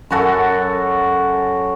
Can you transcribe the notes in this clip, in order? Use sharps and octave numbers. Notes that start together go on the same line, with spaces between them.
F#2 C#4 F#4 A4